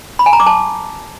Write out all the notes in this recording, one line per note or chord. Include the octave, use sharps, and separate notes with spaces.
B5
G#5
A#5
D6
A5